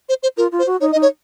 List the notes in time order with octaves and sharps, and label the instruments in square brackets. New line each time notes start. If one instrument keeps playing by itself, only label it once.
[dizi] C5
C5
[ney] F4 [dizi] A#4
[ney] F4
[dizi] C5
[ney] F#4
[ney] D#4 [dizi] C#5
[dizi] D#5
[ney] D#4
[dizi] C#5